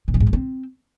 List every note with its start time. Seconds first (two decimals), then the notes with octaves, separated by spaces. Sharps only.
0.08 A#2
0.14 F3
0.20 G#2
0.27 G#3
0.33 C4